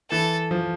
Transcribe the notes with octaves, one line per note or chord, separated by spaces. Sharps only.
E3 A4
F3